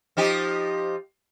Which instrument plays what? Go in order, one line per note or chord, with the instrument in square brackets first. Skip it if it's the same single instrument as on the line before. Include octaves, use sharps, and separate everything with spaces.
[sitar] F3 D#4 G4